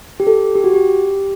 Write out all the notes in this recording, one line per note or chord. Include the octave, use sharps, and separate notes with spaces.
G4
A4
G4
F#4
G4